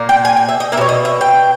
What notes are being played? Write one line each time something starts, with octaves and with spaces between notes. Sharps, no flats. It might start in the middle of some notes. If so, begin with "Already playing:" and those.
Already playing: A#2 A#3
G5
G#5
G5
E5
D#5
A#3 E5
B2 C#5
D#5
E5
G5